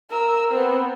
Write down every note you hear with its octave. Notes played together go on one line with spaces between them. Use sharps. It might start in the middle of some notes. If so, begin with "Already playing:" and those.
A#4 E6
B3 C4